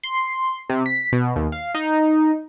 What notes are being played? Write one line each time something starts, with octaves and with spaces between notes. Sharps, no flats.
C6
C3
B6
B2
D#2
F5
D#4